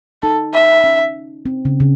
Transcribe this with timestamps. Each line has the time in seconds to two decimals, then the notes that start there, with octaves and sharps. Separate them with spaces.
0.22 D#4 A4
0.54 E5
0.84 C#4
1.46 C4
1.65 C#3
1.80 C#3